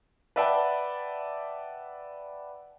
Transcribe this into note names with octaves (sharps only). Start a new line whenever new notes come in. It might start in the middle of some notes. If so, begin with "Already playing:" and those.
B4 D5 E5 F#5 G5 A5